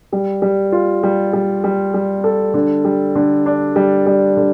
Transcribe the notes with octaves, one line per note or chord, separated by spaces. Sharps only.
G3
G3
F4
G3
G3
G3
G3
A4
D3
G3
D3
D4
G3
G3
D3